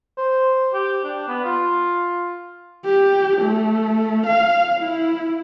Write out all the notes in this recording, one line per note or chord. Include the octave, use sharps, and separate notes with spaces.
C5
G4
D4
B3
F4
G4
A3
F5
E4